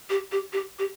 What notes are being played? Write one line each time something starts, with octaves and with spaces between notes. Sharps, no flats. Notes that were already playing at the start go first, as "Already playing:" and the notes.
G4
G4
G4
G4